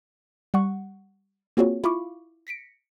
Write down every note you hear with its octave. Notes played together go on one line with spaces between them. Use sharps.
G3 F#5 C#6
A#3 C4 F4 F#4 G#4 C#5
E4 F4 F5 B5 C#6 D6
A#6 B6 C#7 D7